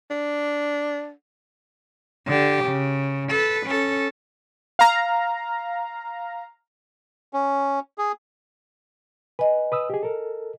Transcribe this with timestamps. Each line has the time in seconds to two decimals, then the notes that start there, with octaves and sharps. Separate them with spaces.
0.11 D4
2.26 D3 G4
2.64 C#3
3.29 A4 B4
3.67 C#4 A4
4.79 F5 A#5
7.33 C#4
7.98 G#4
9.39 B4 D#5 G#5
9.72 B4 D#6 E6
9.90 G4 G#4
10.03 A4 A#4